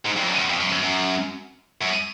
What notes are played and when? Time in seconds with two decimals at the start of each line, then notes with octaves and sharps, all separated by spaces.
0.05 G#2
0.16 G2
0.22 F2
0.27 F#2
0.38 E2
0.50 F2
0.60 F#2
0.72 F#2
0.83 F#2
1.82 F#2